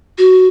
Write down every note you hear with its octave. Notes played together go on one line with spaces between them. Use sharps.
F#4